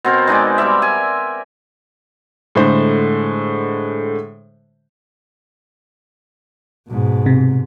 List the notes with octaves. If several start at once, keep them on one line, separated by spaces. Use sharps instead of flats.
B2 C4 A#4
G#3 D#4 D5 G#5
G3 A#4 D5 E5
G#5
A2 D3 G#3 C5
G#2 B2
C3